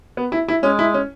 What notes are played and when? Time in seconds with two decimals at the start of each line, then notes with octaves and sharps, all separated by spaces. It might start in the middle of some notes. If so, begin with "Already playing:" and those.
0.17 B3
0.32 E4
0.48 E4
0.63 G#3 C#4
0.79 E4
0.94 C#4